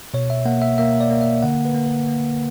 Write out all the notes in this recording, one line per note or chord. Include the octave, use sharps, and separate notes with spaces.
B2 C#5
E5
A#3 F#5
E5
A#3 E5
D5
A#3
E5
D3 F#5
B4
A#3
A#4
A#3